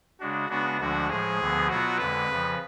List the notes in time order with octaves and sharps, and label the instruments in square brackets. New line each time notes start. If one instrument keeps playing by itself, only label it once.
[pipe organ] C#3 G#3 D4 [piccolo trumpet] F#4
[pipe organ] C#3 G#3 B3 D4 [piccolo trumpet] F#4
[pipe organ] D2 D3 F3 G#3 D4 [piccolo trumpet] F#4
[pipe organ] A2 F3 G#3 [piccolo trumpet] G#4
[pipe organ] D2 D3 F3 B3
[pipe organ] B2 F#3 B3 F4 [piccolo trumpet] F#4
[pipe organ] F2 D3 G#3 [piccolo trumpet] B4
[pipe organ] F2 C#3 F3